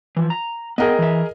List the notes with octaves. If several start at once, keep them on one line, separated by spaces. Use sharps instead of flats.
E3 F3
A#5
B3 G#4 A#4 D#5 G5
E3 E5